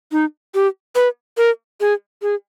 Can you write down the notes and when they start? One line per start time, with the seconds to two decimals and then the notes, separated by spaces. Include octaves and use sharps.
0.12 D#4
0.55 G4
0.95 B4
1.37 A#4
1.81 G#4
2.22 G#4